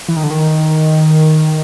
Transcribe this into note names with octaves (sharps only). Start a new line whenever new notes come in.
E3
D#3
D3
D#3